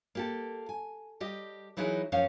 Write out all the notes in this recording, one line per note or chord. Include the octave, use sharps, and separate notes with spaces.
A#3 G4 A4
G#5
G3 G4 D#5
E3 F#3 D#4 E4 G#4 A#4
F#2 F3 C#4 C5 F5